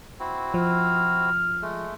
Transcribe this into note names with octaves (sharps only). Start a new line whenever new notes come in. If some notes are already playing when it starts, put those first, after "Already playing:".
C4 E4 F#4
F3 F6
G#3 A3